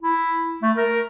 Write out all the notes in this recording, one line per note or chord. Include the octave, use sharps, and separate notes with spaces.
E4
A3
A#4